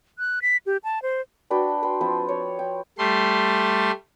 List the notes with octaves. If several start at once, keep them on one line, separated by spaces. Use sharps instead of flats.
F#6
B6
G4
A5
C5
D4 F#4 B4 G5
B4 G5 C6
F3 C4 B4 C5
C#5
G5
G3 A3 C6